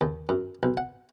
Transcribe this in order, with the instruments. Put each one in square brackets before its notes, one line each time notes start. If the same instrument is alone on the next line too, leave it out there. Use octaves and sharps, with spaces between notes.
[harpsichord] D#2
F#2
B1
F#5